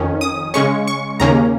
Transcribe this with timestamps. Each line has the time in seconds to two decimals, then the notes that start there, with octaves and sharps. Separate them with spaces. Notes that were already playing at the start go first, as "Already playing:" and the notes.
Already playing: F2 D#3 C#4
0.21 D#6
0.54 C#3 G#3 C#4 C#6
0.88 C#6
1.20 D#2 C#3 A#3 C#4 A#5